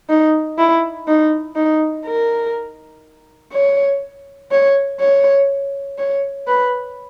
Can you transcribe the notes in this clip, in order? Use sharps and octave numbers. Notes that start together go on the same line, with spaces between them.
D#4
E4
D#4
D#4
A#4
C#5
C#5
C#5
C#5
B4